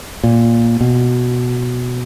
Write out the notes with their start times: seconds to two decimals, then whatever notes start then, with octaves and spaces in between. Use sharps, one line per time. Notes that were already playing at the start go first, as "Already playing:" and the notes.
0.24 A#2
0.81 B2